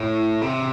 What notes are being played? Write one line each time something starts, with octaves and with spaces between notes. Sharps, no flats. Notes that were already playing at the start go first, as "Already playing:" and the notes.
Already playing: A2
C3